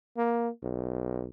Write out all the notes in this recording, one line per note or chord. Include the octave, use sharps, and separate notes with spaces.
A#3
B1